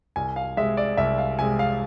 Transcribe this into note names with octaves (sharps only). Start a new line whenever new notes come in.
C2 G#5
F5
C3 G#3 E5
D5
C2 E5
F5
C3 G#3 G#5
F5